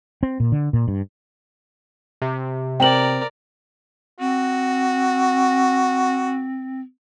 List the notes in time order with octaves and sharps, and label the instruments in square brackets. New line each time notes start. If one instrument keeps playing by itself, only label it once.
[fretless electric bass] C4
A#2
D3
A#2
G2
[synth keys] C3
[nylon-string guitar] C4 [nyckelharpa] A#4 D5 [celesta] G5 F#7
[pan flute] C4 [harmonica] F#4